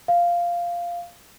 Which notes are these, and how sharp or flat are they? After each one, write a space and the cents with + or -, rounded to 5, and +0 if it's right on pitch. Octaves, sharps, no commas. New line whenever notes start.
F5 -5